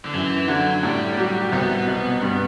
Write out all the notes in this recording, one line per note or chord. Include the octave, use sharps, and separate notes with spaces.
D3
F#2 E3
D3 F#3
A2 G3
F#3
C2 B3
B2
G2